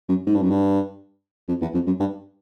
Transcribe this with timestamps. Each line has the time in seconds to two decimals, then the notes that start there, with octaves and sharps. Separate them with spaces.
0.09 F#2
0.27 G#2
0.35 G2
0.43 F#2
0.50 G2
1.48 F2
1.62 E2
1.74 F2
1.87 F#2
2.00 G2